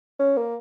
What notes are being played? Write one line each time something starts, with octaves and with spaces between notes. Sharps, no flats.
C#4
A#3